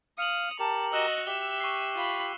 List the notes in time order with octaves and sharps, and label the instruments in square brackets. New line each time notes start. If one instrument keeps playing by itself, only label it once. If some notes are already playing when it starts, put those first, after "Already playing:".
[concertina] F5 [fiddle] D#6 [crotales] C#7 F7 F#7
[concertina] G4 A#4 [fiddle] A5
[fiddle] F#4 D#5 [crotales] E6 F#6 E7
[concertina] G4 [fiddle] E5 [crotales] G7
[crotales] C#6 C7
[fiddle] F4 B5